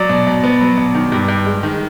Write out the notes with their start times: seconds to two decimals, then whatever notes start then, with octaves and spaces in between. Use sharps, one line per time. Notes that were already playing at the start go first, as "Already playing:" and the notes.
Already playing: F#3 D5
0.09 B2
0.27 B2
0.44 B3
0.61 F#3
0.77 B2
0.95 D#3
1.12 G2
1.28 G2
1.46 G#3
1.63 D#3